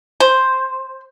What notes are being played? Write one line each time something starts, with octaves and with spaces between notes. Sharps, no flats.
C5